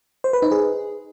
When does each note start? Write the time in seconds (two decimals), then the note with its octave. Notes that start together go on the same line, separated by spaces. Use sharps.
0.24 C5
0.33 B4
0.42 D#4
0.51 G#4